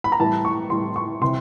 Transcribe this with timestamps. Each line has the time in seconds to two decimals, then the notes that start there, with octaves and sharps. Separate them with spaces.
0.04 B5
0.12 A#5
0.20 A2 E3 G3 A5
0.45 C#6
0.70 A2 E3 G3 C6
0.96 C#6
1.21 C3 E3 C6